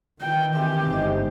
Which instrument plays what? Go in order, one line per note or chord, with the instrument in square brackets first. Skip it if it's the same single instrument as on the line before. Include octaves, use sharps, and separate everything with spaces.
[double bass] D#3 E3 [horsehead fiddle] G5
[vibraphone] C4 E5 G#5 [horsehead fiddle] G4
[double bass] G1 G#2 [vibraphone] D#4 C5 D#5